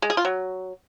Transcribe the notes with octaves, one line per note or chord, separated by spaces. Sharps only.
G#3
G#4
F4
F#3